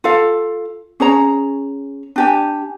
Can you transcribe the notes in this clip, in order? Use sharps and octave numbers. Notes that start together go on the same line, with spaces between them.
F4 A4 F5
C#4 G#4 C#5 A#5
D4 G4 G#5